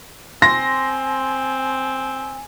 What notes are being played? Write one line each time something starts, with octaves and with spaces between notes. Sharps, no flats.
C4 G#5 C6 A#6